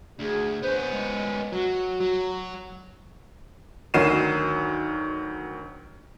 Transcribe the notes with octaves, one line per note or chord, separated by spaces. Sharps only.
D2 G#4
B3 C#4 C5
G#3
F#3 F#4
F#3
D2 D#3 F#3 C7 D#7 E7